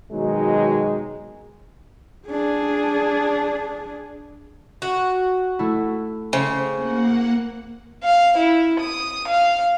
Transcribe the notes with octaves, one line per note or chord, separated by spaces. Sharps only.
B2 D#3 F#3 G#3 D#4
D4 G#4
F#4
A3 E4
C#3 C4 C5
A#3 F#5
F5
E4
D#6
F5